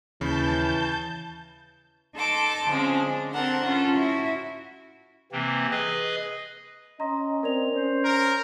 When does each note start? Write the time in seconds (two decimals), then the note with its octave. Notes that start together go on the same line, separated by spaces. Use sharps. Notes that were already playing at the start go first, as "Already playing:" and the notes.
0.21 D#2 C#3 E3 A5 B5 G6
2.16 D#4 A4 A5 C6 D6
2.70 D3 F3 G#3 C4 C#4
3.02 D4
3.33 C4 D4 A4 A#4 F#5
3.65 C#4 F4 A4
3.97 E4 F#4
5.32 C3 E3 A#3 C4
5.71 G#4 B4 D#5
7.00 C#4 D#5 A#5 C6
7.43 C4 A#4 D5 F7
7.72 C#4 C5
8.05 A#4